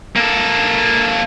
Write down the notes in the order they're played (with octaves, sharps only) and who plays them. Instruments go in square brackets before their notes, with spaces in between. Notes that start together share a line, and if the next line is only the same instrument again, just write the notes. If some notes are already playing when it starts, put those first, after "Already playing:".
[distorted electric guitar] A#3 A4